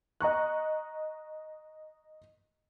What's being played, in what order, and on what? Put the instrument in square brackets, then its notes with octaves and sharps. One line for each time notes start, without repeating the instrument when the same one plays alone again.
[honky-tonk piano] D#5 A#5 C#6 F#6